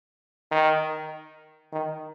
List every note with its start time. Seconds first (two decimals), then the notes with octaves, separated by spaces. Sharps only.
0.51 D#3
1.73 D#3